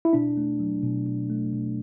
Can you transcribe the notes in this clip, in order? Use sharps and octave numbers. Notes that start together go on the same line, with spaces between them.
E4
B2 D4
A3
F#3
B2
B2
A3
B2